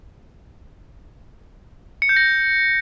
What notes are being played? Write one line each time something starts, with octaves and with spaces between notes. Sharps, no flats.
C#7
G6
A#6